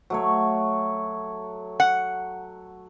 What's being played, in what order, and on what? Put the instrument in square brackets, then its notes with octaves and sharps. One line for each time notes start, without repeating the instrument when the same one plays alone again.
[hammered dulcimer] F#3 A3 C#5
[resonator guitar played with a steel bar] F#5